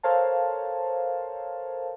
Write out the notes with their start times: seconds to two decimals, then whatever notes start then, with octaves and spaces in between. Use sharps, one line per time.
0.03 A4 A#4 C5 C#5 F5 A5